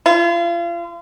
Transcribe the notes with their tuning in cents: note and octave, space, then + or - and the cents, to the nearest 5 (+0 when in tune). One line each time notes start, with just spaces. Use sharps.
F4 -35